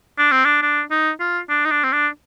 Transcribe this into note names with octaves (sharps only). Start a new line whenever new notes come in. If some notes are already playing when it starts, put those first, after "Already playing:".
D4
C4
D4
D4
D#4
F4
D4
D#4
D4
C4
D4